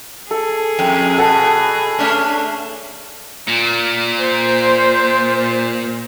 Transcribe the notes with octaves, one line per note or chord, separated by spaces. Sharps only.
G#4 A4
F2 G5
B2 A4 F#5 A5
A3 C#4 D4
A#2
C5